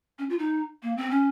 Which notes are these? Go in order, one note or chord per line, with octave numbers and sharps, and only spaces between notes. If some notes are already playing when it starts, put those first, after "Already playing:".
C#4
F4
D#4
A#3
C4
C#4